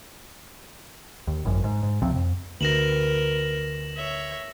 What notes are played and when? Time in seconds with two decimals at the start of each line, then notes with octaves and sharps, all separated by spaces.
1.27 D#2
1.45 G#1 F#2
1.64 G#2
1.83 G#2
2.02 C#2 C3 F3 C4
2.16 F2
2.61 D2 A#4 B4 A#6 E7 F#7
3.96 C#5 E5